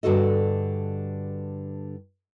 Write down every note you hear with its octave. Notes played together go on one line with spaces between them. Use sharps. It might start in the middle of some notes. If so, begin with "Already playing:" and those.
G2 D3 F#4 A4 D#5